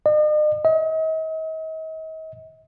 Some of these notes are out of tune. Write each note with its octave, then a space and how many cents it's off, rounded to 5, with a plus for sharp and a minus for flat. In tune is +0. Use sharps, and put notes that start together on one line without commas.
D#5 -45
D#5 +40